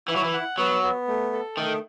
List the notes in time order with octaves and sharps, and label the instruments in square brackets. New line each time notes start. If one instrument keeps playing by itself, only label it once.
[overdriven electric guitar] E3 [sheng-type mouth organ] E4
[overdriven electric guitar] F#3
E3
[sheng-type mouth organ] F#5
[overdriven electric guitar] F#3 [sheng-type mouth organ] B3
[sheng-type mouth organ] B3
A3
A4
[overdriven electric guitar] D#3 [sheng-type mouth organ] A3